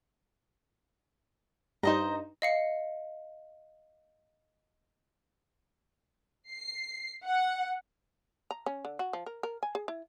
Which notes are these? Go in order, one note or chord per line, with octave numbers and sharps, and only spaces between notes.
G2 D#4 C5 D#5 A#5
D#5 F5 C#7
C7
F#5
A#5
C#4
D3
F#4
F3
A#4
A#4
G#5
G#4
E4